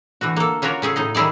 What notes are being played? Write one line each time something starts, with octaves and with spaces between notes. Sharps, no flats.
D3 E3 A3 F#4
A#3 A4
A#3 C#4 F4 F#4 A#4
C#3 C#4 G#4 A4
A2 D#4 D#5
D#3 G3 E4 G#4 D5